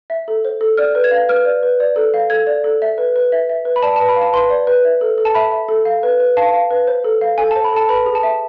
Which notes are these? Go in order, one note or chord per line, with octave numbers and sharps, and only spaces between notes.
E5
A4
C5
A4
D5 F6
B4
G#6
F5
B4 F6
D5
B4
D5
A4
F5
A4 G#6
D5
A4
E5
B4
B4
E5
E5
B4
B5
D5 A5
A5
B4
B5
F5
A5
B4 C6
D5
B4
E5
A4
A4
A5
E5 B5
E5
A4
F5
B4
B4
F5 A5
F5
B4
C5
A4
F5
A4 G#5
A5
C5
B5
A4 A5
B4 B5
G#4
A5
E5